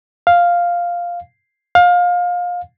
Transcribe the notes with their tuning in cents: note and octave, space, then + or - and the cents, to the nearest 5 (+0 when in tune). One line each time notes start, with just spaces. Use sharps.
F5 +0
F5 +25